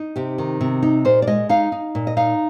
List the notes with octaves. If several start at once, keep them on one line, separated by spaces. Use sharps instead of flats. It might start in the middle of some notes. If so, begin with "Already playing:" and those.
Already playing: D#4
C3 G4
D#3
C3
D#4
A#2 C5
D5
G#3 D#5
D#4 F5
D#4
A#2
D#5
D#4 F5